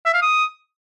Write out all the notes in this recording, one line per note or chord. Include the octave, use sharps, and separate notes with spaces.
E5
F5
D#6